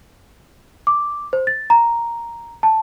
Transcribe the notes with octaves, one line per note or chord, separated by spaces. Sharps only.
D6
C5
A6
A#5
A5